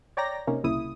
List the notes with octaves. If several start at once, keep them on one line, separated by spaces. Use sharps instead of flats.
C#5 D5 G5 A#5 A#6
C3 A#3 C#4 D#4
C2 A#2 C#3 E4 D#6